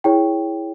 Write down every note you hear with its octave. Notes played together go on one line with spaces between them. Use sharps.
E4 G#4 C#5 G5